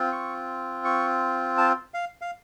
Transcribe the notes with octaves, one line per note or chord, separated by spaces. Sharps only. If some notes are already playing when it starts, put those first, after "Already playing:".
Already playing: C4 F4
C#6
C#6
A5
F5
F5